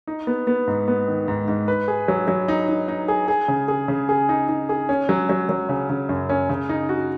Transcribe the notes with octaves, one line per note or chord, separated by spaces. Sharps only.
D#4
B3
B3
G#2
B3
D#3
G#2
G#2
B4
G#4
F#3
F#3
D#4
D#4
D#4
G#4
G#4
C#3
G#4
C#3
G#4
D#4
D#4
G#4
C#4
F#3
F#3
F#3
C#3
C#3
F#2
C#4
C#3
D#4
F#4